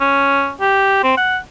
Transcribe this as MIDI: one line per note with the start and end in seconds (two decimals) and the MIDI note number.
0.01 0.52 61
0.61 1.00 67
1.04 1.14 60
1.17 1.38 78